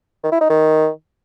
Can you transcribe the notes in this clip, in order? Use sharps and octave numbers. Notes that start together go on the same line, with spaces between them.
D#3
E4
D#4
D#3